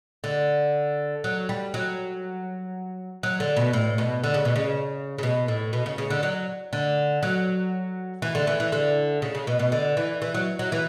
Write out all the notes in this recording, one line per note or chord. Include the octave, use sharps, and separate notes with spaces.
D3
F#3
G3
F#3
F#3
D3
B2
A2
B2
D3
C#3
B2
C#3
C#3
B2
A2
B2
C#3
C#3
D3
F#3
D3
F#3
E3
D3
E3
E3
D3
C#3
C#3
B2
B2
D3
E3
E3
F#3
F#3
E3